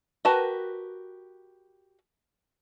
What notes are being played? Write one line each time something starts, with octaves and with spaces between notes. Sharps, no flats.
F#4 G4 A#4 B4 A5